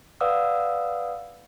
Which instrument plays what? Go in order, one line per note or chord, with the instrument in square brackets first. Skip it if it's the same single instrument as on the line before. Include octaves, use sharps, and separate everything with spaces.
[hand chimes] B4 D5 F5 F#5 D#6 E6